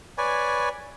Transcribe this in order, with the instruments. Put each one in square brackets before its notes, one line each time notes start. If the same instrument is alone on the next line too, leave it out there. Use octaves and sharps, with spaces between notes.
[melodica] B4 C#5 D5 G#5